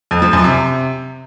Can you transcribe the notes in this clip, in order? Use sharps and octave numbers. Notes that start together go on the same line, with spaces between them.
F2
F3
F#2
C3